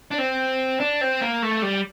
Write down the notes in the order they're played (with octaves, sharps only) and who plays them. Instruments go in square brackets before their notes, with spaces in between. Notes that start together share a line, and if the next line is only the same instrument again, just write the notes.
[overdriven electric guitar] D4
C4
D4
C4
A#3
A3
G3